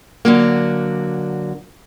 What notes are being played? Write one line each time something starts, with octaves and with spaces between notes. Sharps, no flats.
D3 F#3 A#3